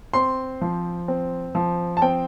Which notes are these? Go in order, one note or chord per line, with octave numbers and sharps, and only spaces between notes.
C4 C6
F3
C4
F3
A5
C4 G5